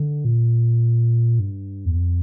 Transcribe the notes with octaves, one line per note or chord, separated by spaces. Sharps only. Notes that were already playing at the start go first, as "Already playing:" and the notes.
Already playing: D3
A#2
G2
E2
F2